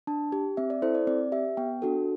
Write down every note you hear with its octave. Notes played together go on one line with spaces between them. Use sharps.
D4 A5
G4
C4 E5
D5
E4 A4 C5
D5
C4 D5
G4 E5
B3 G5
D4 F#4 A4